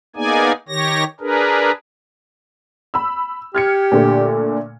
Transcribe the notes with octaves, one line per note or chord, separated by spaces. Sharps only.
A#3 B3 D#4 G#4 D5 G#5
D#3 G4 C#5 A#6
D4 G#4 A#4 B4
B5 E6
G4 F6 G#6 C#7
A#2 D3 A3